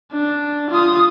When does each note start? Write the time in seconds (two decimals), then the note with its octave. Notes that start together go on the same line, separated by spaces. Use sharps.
0.12 D4
0.70 F4 D#6